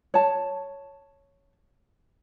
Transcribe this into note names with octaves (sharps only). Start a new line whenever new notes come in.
C#5 A5